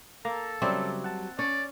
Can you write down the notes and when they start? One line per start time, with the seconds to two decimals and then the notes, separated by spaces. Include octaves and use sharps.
0.25 A#3 A4 A#5
0.62 C#3 F#3 G3 C4 C#5 D5 E5
1.04 F#5 A5
1.39 C#4 C#5 D5